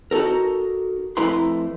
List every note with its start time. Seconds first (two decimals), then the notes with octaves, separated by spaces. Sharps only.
0.11 D#4 F#4 A4 A#4
1.17 F2 A3 E4 B4 A#5 C6